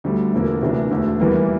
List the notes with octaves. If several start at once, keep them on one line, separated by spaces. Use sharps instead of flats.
D2 D3 G3
E1 D2 D3 F3 A#3
D2 C3 E3 A#3 D4
E1 D2 D3 A3
E2 E3 G3 A#3